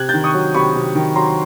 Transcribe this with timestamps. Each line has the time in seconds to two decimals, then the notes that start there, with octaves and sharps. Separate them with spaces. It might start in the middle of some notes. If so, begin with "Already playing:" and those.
Already playing: C3 F#6 G#6
0.09 D#3 G6 A6
0.24 C#6 D#6
0.34 F#3
0.54 C3 B5 C#6
0.75 C3
0.95 D#3
1.16 F#3 A#5 C6